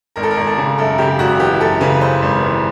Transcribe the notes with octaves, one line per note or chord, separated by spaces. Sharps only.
G#1 A#4
A4
A#4
G#1
A4
C#3
F#2 A4
C#3 G4
G#1 F#4
E3 G4
F#2 A4
C#3 B4
E3 C5
G#1
E3